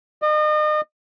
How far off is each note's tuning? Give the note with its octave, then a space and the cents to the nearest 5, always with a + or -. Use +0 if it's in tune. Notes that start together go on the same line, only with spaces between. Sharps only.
D#5 -35